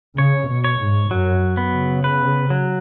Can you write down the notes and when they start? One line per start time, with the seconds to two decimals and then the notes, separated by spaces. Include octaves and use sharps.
0.17 C#3 C#5
0.48 B2
0.64 C#5
0.80 G#2
1.11 F#2 F#3
1.57 B3
1.73 C#3
2.04 B4
2.50 F#3